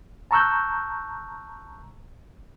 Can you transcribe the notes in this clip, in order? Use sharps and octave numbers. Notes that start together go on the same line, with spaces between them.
A5 A#5 C#6 E6 F#6 G6